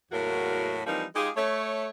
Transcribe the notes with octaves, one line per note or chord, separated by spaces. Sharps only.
E2 A2 F#3 A#3 F#4 A#4
E3 F3 G3 A#3 C4 D#4
G#3 D#4 F4 G4 G#4
A3 C#5